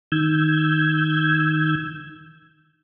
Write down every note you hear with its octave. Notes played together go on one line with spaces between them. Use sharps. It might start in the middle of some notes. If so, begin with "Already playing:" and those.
D#3 E6 G6 G#6